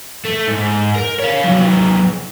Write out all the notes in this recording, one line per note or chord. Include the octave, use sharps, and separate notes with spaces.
A3
G#2
A#4
C#5 F5
C3 F#3